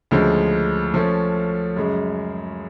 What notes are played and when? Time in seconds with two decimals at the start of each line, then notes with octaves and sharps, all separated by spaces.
0.11 D2 C#3 F3 G#3
0.94 F3 A3 C#4
1.76 F#2 C#3 G#3